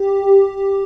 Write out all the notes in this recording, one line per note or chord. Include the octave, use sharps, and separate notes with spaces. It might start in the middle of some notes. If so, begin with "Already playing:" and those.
Already playing: G4